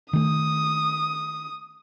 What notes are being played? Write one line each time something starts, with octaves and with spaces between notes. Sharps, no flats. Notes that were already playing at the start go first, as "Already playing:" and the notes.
D#3 A3 D#6